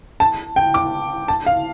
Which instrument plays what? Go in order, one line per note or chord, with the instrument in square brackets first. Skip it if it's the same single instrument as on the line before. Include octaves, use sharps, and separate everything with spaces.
[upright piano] A5
G5
D6
A5
F5